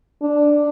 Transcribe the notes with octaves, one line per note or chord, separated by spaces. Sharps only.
D4